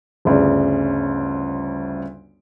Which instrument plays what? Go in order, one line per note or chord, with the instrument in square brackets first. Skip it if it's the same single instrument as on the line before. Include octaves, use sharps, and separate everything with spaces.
[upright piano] G1 D2 C#3 D5